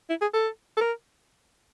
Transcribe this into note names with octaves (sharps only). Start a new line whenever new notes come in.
E4
G#4
A4
A4
A#4